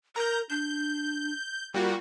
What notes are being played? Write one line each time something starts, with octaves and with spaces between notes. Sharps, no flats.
A#4 A#5 G6
D4 G6
G3 A#3 F4 F#4